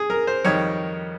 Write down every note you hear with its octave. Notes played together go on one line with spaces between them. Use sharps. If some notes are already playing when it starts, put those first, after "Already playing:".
Already playing: G#4
A#4
C5
F2 D#3 G3 C#5